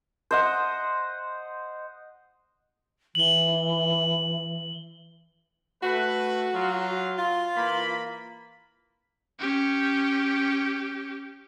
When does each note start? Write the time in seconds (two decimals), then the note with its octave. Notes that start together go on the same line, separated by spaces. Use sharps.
0.31 C5 D#5 F#5
3.15 E3 F#7 G7
5.83 A3 F#4 B4
6.54 F#3 F4
7.18 F4
7.56 E3 A#3 B5
9.39 C#4 G4